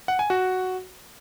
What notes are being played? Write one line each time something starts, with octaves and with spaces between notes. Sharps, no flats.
F#5
G#5
F#4